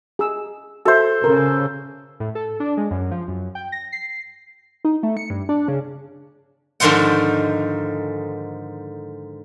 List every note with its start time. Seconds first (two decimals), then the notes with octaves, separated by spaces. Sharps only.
0.19 G#4 E6
0.85 F#4 A4 C5 E5 C6
1.24 C#3 A#4
2.20 A2
2.35 A4
2.60 D4
2.77 G#3
2.91 F#2
3.11 F3
3.28 F#2
3.55 G5
3.72 A#6
3.92 C7
4.85 D#4
5.03 A3
5.17 C#7
5.30 G2
5.49 D4
5.68 C#3
6.80 G#2 D3 D#3 F3 C5 F#5